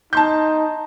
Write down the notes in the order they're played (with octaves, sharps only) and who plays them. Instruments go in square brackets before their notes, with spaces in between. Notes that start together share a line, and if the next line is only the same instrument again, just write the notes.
[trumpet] D#4 [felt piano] A5 C6 G6